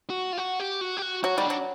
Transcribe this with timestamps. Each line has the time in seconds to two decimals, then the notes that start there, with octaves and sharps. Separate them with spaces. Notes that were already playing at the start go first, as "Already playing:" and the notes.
0.10 F#4
0.33 F4
0.38 F#4
0.60 G4
0.81 F#4
0.97 G4
1.02 F#4
1.24 F#3 F#4
1.37 G3 D#4
1.46 F#3 D4